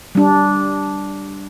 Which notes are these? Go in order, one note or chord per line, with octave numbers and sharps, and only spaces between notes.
G3 D4